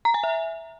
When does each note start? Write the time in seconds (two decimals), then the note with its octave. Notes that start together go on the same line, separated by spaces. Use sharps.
0.05 A#5
0.14 G#5
0.23 E5